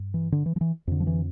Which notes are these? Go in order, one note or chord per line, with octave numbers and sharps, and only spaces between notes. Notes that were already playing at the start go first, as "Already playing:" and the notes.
Already playing: G2
E3
D3
E3
F3
E3
F2 D3
F3
E3